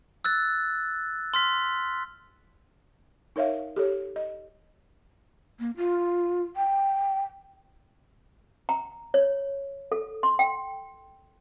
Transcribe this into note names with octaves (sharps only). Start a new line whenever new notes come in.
E6 F#6 A6
C6 F6 B6
D#4 A#4 C#5 E5 F5
G4 A4 C#5
D#5
A#3
F4
G5
A#5
C#5
A4
C6
G5